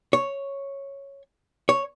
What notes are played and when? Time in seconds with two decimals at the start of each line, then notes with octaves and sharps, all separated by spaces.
0.13 C#5
1.69 C#5